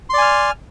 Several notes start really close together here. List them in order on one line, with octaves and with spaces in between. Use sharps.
C6 D5 G#5 F6